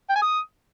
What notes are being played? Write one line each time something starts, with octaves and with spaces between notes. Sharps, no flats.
G5
G#5
D#6